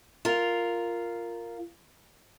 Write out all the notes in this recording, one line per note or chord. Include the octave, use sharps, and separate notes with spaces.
F4 A#4